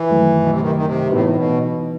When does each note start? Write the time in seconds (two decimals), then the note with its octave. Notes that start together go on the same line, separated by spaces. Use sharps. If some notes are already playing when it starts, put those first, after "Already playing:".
Already playing: E3
0.10 F#2 D#3 F#3 A3
0.40 B2
0.50 C3
0.60 D#3
0.75 D#3
0.85 C3
1.11 A2 E3 B3 D#4 F#4 B4
1.29 A2
1.36 B2